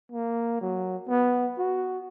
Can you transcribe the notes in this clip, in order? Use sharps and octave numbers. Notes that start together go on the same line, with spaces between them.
A#3
F#3
B3
F#4